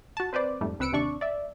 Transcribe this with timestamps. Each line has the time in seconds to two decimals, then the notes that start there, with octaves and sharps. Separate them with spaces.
0.17 F#4 A5
0.33 C4 B4 C5 D5
0.61 F2 G#2 G3 A3
0.79 C#2 C4 B4 E6 C#7 D7
0.92 D#2 C3 D4 D5 C#6
1.21 D5 E5